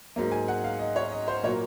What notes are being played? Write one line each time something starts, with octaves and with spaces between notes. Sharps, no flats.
G#2 F#3 A#3
G#5
F#5
F5
D#5
C#5
D#5
C5
A#2 F#3 A#3 C#5